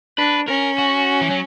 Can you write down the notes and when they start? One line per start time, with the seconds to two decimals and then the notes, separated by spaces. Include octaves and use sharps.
0.18 D4 B4
0.48 C#4 A#4
0.78 F#4
1.21 E3
1.30 F#3